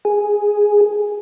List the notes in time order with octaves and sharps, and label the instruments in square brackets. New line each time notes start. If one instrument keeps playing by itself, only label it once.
[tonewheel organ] G#4